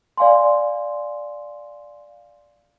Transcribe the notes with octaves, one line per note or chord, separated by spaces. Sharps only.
D5 F5 G#5 C6